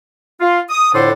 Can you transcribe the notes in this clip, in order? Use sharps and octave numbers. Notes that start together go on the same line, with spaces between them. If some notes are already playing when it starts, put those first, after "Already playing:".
F4
D#6
F2 A2 D3 D4 A4 C5